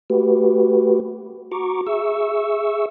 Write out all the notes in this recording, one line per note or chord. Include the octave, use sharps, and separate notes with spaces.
A3 F#4 G4 B4
F#4 A#5 C#6 D6
G#4 E5 C#6 E6